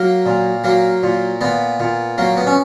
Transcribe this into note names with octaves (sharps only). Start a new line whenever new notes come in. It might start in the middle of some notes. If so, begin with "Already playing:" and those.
Already playing: F#3 A#3
A#2
F#3 A#3
A#2
A#2 B3
A#2
F#3 A#3
B3
C#4